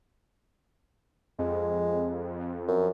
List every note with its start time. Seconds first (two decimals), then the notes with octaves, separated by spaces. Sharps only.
1.39 F2 G#3
2.68 F#2